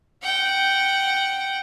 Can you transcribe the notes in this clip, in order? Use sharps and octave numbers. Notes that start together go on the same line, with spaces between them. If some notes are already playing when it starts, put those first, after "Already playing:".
F#5 G5